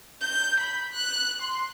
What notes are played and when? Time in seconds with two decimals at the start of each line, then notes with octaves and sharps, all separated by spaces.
0.21 G6
0.60 B5
0.93 F#6
1.42 C6